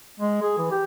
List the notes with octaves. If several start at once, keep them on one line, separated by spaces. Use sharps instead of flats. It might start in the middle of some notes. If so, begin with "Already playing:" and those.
G#3
G#4
E3
G4